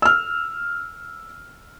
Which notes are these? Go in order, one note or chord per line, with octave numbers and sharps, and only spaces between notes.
E6 F6